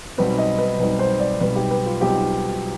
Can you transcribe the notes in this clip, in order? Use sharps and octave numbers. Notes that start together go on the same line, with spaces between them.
B1 B2 G3 C4 D#4 B4
D#5
B4
B1 B2 G3 C4 D#4 B4
C5
D5
B1 B2 G3 C4 D#4 B4
G4
B4
F4
B1 B2 G3 C4 D#4 G4